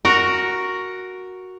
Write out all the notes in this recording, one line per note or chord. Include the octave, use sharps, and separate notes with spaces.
F#4 A#4